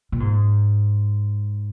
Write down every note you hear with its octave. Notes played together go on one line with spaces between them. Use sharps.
A#2
G#2